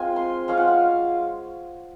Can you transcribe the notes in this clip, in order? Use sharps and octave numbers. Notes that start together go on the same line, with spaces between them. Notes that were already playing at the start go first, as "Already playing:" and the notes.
Already playing: G#3 C4 F4 G#5
C6
G#3 C#4 F4 F5
F#5
F5